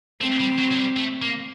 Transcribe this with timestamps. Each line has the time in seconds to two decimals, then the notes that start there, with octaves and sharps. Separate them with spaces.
0.21 A3 C4
0.40 G3
0.59 F#3
0.72 F#3
0.78 G3
0.97 A3
1.22 A#3